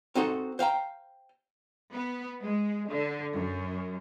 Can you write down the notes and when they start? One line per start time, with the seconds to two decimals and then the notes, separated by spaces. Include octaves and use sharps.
0.15 C4 D#4 F#4 A4 C5
0.59 C5 F5 G5 A#5
1.93 B3
2.43 G#3
2.89 D3
3.34 F#2